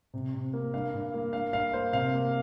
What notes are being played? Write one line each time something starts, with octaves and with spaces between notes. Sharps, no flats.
C3
C3
A#3
G2 F5
G2
A#3
G2 F5
G2 F5
A#3 C5
C3 F5
A#3